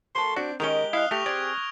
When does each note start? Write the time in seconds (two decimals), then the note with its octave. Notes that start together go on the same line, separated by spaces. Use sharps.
0.15 F#3 A#3 A4 C6
0.36 C4 D4 F#4
0.60 D#3 G#3 C#4 G4 A#4 D#5 F7 G7
0.93 E4 F5 D#6 F6 F#6
1.11 A3 G4 C#6 A#6 F7
1.26 C4 G#4 D5 G#6 D7